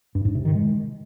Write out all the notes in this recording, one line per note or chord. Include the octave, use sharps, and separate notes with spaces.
G2
G#2
C3
D#3
G#3